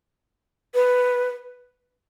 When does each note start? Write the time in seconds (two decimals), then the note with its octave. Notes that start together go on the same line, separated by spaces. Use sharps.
0.75 B4